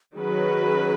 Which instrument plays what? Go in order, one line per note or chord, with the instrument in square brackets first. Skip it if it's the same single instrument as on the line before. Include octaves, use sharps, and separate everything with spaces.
[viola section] D#3 F#3 C#4 F#4 B4 [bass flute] G#4